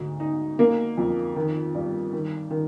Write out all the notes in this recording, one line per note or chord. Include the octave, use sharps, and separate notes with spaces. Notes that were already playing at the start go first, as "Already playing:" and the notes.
Already playing: D2 G#2
D#4
A#3
F2
D#3
G2
D#3
D#3